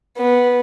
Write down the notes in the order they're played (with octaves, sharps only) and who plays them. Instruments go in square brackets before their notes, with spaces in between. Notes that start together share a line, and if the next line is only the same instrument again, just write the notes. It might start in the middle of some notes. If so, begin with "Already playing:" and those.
[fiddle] B3